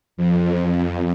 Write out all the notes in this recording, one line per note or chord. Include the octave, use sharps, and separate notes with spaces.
F2